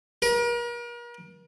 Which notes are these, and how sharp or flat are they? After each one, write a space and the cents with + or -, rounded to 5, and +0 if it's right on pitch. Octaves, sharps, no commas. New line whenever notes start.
A#4 +40